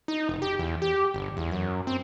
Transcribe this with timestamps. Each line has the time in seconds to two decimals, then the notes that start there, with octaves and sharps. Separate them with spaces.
0.08 D#4
0.29 F1
0.42 G4
0.59 E2
0.82 G4
1.14 G1
1.37 E2
1.51 F#2
1.87 C4